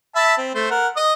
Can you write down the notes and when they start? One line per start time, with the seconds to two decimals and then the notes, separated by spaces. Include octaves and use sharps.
0.16 E5 A5 B5
0.38 C4
0.55 A3 C5
0.71 A#4 F#5
0.97 D#5 D#6